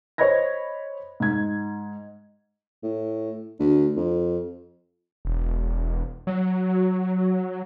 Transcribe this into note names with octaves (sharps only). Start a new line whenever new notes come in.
C5 C#5 D#5 B5 G#6 A#6
G#2 G#6
A2
D2
F2
E1
F#3